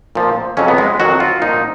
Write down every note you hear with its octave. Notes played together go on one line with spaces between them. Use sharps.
A#2 F3
F2 C#3 F#3 C#4
B3
G#3
F2 D#3 F#3 F#4
F4
A#2 F3 D#4